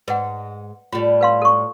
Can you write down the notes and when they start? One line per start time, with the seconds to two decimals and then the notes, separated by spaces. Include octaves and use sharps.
0.08 G#2 B4 F#5
0.93 A2 G3 F4
1.21 B4 F5 C6
1.42 A4 C#6